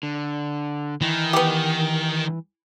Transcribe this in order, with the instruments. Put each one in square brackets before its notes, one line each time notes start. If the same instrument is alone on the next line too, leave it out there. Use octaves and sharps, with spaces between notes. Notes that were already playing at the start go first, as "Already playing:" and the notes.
[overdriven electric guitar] D3
[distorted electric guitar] D#3 [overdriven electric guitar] E3
[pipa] B3 G4